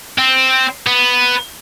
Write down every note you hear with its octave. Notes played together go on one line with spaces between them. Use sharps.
C4
B3